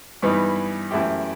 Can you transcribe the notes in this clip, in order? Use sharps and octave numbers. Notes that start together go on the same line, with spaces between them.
G2 E3 B3 D#4
F#2 E3 A3 E4 G4